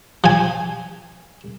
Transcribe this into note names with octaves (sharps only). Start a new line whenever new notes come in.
F3 G#5